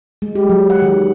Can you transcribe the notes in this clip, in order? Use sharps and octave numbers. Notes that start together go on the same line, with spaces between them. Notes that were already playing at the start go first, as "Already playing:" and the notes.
G#3
G4
F#3
F#5
D#3